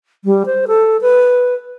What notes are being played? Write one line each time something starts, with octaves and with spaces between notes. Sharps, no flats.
G3
C5
A4
B4